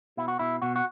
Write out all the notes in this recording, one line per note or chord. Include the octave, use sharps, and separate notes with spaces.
B2 E4
F#4
B2 E4
B2 F#4
F#4